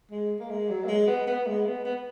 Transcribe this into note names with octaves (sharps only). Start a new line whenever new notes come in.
G#3
A#3
G#3
F#3
A#3
G#3
B3
B3
G#3
B3
B3